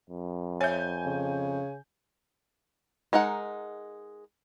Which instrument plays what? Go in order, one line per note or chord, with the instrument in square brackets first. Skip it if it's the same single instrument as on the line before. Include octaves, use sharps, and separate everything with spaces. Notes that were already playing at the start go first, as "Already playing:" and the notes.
[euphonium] F2
[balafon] C#5 E5 [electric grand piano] G#5 G6
[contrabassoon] C#3
[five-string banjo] G#3 D#4 A#4 F#5